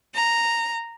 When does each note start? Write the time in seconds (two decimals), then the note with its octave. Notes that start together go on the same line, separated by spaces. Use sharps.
0.14 A#5